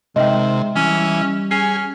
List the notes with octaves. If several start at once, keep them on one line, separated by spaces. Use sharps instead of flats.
C3 D#3 G#3 D#5 E5 G5
E3 G3 C#4
C#4 G#4 C7